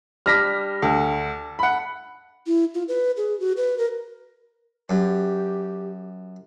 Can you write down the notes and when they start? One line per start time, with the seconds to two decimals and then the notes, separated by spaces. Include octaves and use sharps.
0.26 G3 D4 F6 A#6 B6
0.82 D2 A4
1.59 F#5 B5
2.47 E4
2.74 F4
2.88 B4
3.17 G#4
3.40 F#4
3.57 B4
3.78 A#4
4.90 F#2 G4